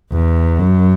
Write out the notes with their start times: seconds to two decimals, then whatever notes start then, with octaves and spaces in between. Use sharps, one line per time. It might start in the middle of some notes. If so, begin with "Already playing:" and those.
0.12 E2
0.59 F#2